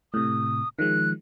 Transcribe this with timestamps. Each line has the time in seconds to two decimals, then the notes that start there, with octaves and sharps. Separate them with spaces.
0.14 A2 C3 D#6
0.79 D#3 F3 G#3 F#6